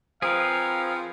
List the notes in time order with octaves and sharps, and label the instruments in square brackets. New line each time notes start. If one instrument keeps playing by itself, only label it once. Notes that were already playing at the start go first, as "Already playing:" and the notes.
[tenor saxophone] F3 [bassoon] C4 [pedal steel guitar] G#4 A#4 B4 [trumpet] F5